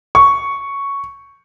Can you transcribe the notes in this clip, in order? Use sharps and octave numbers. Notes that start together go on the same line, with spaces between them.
C#6